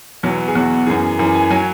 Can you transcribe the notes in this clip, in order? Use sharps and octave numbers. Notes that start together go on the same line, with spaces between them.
E2 B2 F#3 B3
G#4
E2 B2 F#3 F#4
F#2 E3 G#4
F#2 E3
G#5
F#3 G#5